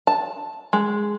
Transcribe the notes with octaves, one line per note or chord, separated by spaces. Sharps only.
A5
G#3